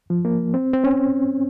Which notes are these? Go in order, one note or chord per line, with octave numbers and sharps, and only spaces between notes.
F3
A#3
C4
C4
C#4